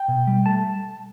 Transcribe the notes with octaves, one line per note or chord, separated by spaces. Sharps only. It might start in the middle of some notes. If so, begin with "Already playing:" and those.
Already playing: G5
B2
G3
A3 A5